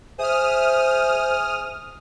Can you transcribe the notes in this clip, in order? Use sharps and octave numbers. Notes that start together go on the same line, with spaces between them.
G#4 C5 E5 D#6 F6